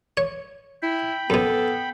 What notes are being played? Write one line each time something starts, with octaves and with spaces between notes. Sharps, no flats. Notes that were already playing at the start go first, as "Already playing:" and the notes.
C#5
E4 G5 B5
F#2 B2 B3 A4